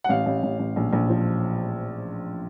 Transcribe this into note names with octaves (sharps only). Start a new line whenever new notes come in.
F#5
A1 F5
A1
A1
A1
A#1
A#1
F3